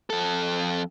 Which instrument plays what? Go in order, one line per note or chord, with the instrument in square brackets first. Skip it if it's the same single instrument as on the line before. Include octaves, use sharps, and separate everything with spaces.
[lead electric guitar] F2 A4